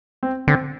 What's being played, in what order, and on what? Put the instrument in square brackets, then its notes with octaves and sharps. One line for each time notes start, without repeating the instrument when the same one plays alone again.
[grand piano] C4
[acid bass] D3 [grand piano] C4